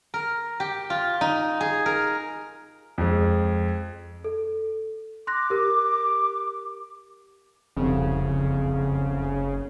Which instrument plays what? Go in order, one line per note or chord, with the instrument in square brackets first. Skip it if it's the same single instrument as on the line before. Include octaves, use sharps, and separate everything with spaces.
[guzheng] A#4
G4
F4
D#4
G#4
A#4
[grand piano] F2 G#3
[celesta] A4
[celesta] C6 F#6 A#6 [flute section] D6
[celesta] G4 A#4
[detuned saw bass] F#1 [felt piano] C2 F2 [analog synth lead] C#3